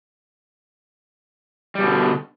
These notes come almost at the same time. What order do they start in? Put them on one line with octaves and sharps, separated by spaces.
G3 B2 D3